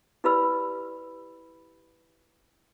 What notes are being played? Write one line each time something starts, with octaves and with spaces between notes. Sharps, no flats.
E4 G4 B4 D5 B5 E6